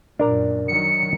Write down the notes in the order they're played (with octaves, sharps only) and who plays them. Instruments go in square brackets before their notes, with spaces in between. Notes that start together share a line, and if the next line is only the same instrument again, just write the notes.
[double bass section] F#2 A#2 [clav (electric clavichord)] D4 A#4 A#5
[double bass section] D#3 F#3 [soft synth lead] C#7